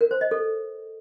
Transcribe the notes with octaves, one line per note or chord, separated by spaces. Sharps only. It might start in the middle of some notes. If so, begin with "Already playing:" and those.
A#4
C5
D#5
A4